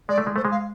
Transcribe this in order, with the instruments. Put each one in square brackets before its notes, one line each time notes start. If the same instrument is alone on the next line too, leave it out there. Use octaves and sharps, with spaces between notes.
[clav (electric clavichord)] G#3 [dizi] D5
[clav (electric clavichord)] A3
G#3
[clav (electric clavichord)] A3 [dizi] C5
[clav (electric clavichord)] G#3
[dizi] F5